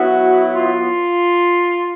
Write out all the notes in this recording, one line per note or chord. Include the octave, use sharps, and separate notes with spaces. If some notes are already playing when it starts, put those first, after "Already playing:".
Already playing: F#3 B3 E4 F#4
F4